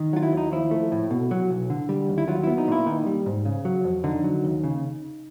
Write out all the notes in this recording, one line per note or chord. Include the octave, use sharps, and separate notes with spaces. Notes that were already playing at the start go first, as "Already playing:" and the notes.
Already playing: D#3
F#3 F4
E4
D#2 D#4
F3 E4
A3
A2
B2
F#3
B1
D3
G3
D#2
E4
F#3 F4
B3 E4
D#4
A#2 E4
D#3 D#4
G3
G#2
C#3
F#3
F2
D3 D#4
F#3
D#2
C#3